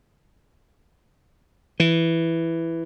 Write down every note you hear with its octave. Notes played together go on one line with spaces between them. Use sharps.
E3